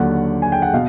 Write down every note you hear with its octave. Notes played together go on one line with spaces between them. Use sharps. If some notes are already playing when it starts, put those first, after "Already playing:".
Already playing: D#2 D3 F#3 F#5
G#5
G5
F#5
B2 F5